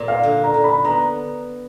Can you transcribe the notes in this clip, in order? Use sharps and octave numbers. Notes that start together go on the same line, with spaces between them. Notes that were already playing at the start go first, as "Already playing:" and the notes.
Already playing: A#2
F5
D3
A#5
D3
B5
B3 A#5